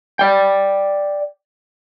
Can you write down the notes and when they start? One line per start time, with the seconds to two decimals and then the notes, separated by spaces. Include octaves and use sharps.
0.19 D5 G5